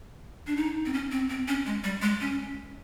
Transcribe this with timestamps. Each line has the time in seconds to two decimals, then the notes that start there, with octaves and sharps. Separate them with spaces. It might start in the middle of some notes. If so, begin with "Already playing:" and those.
0.47 D4
0.57 D#4
0.86 C4
0.93 C#4
1.12 C4
1.30 C4
1.48 C#4
1.66 G#3
1.84 G3
2.02 G#3
2.21 C#4